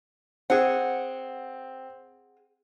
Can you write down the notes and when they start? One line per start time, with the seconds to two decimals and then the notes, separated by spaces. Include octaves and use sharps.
0.50 C4 G#4 F#5